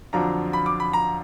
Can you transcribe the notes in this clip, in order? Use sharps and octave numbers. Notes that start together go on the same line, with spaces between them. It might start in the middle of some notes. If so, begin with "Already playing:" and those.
F2 D3 F#3 D4 F4 A#5
B5
D6
B5
A#5